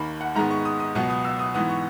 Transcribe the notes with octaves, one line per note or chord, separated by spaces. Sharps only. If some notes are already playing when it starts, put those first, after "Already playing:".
Already playing: D#2 D#3 A#3 B5
F#5
G#2 D#3 G#3 B3 A#5
C#6
D#6
D#6
C#2 B2 F#3 B3
D#6
E6
D#6
G#2 E3 B3 D#6
C#6